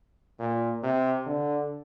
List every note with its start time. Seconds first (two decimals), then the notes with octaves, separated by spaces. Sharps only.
0.39 A#2
0.83 C3
1.26 D3